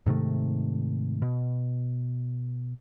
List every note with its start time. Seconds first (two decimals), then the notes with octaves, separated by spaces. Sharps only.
0.06 G#2 C3 D#3 A3
1.22 B2